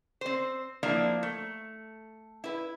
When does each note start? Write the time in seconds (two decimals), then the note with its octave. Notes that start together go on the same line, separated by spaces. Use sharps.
0.21 C4 C5
0.83 F3 A#3 C4 D4 E4
1.23 A3
2.44 E4 B4